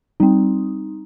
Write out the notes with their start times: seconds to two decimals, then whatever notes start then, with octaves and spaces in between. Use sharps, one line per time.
0.20 G3 C4 D#4